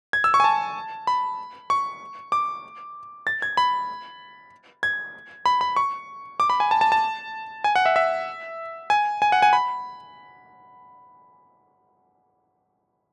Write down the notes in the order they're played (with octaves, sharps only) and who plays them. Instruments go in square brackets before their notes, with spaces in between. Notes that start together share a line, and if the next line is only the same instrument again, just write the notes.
[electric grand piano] G#6
E6
C#6
G#5
A5
B5
C#6
D6
A6
G#6
B5
G#6
B5
B5
C#6
D6
B5
G#5
A5
A5
A5
G#5
F#5
E5
E5
G#5
G#5
F#5
G#5
B5